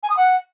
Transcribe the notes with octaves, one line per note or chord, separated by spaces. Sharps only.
G#5
D#6
F#5